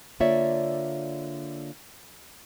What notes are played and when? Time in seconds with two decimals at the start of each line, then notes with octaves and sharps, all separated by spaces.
0.20 D3 A#3 F4 C#5 D5 E5